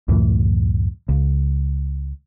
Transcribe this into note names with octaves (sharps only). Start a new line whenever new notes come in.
C#2 F#2 A2 E3
C#2